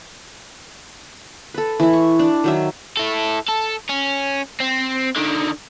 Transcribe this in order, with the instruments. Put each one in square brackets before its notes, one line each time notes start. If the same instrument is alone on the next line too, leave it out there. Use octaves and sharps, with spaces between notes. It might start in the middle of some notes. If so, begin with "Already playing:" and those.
[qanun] A4 B4
E3 E4
C#6
D4
D#3 F#3 E5
[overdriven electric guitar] E4 A4
A4
C#4
C4
D3 D#3